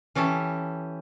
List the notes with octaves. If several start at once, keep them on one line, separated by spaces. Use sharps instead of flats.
E3 C#4 G4 A4